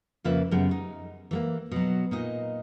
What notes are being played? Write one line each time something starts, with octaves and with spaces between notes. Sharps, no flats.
F2 C#3 A#3 F4 B4 E5
F#2 C#3 G3 B3
D#4
E3 A3 A#3
B2 F#3
A#2 D#4 D#5